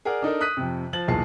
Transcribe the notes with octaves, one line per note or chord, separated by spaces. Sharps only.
G#4 A#4 D5 F#5
D4 D#4 A4 A#4
D#6 F#6 B6 D#7
F2 C3
F3 A6 F#7
B1 E2 A#2 G#4 A5 C7